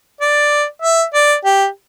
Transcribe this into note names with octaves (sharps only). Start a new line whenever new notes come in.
D5
E5
D5
G4